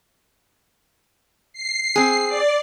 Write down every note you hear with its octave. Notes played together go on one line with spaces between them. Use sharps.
C7
C4 G#4
D5